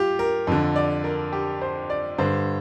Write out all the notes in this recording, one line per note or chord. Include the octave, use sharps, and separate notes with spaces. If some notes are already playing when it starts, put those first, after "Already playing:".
Already playing: F4 G4
A#4
F2 D3
D5
A#4
G4
C5
D5
G2 D3 C5